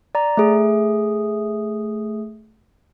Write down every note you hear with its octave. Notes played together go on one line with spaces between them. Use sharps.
D5 A#5
A3 G#4